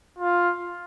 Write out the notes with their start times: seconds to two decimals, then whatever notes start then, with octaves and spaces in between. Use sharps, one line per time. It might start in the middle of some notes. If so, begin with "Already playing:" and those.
0.19 F4